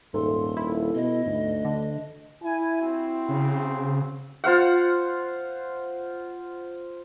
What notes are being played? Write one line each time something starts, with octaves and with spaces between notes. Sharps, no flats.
D#1 G#2 A4 C6
E4
B2 D#5
D2 G#2
D3 D4
E4 G#5
C4 F#4
C#3
F4 C5 F5 F#5